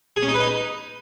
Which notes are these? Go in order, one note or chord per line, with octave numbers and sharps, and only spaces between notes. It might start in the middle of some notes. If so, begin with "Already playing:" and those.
G#4
C#4
D#4
B4
D#4